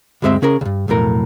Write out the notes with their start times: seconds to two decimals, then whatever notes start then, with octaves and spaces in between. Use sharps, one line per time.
0.22 D2 G2 G#3 C4 E5
0.42 C#3 C#4 G#4 A#4
0.61 C#2 G2
0.88 B1 F2 A2 A#4